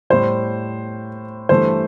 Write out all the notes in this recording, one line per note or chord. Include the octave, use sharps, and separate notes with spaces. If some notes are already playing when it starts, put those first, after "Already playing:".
A2 G3 C5
G2 E3 A3 C5